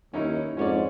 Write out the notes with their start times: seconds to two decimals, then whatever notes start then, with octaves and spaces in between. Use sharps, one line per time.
0.14 D#2 C#4 D#4 E4
0.57 F2 G#2 C#4 C#5 D5